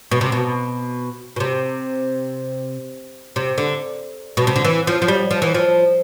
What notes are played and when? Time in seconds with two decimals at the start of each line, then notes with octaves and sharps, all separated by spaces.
0.11 B2
0.21 C3
0.32 B2
1.36 B2
1.40 C3
3.36 C3
3.58 D3
4.37 B2
4.47 C3
4.56 D3
4.65 E3
4.87 F3
5.02 F3
5.08 G3
5.31 F3
5.42 E3
5.55 F3